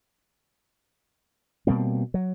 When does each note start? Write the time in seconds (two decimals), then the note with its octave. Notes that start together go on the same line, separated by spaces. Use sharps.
1.67 B2 G3 A#3 C4
2.14 F#3